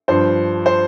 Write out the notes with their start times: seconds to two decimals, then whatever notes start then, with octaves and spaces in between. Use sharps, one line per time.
0.08 G2 F3 C5
0.66 C5